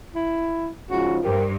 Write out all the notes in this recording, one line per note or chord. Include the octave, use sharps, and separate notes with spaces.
E4
G#2 C#3 F3 F#4
G2 G4 A#4 C5